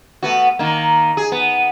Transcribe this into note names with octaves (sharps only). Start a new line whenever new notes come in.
A3 B3 F#4
D#3 A#3
G#4
B3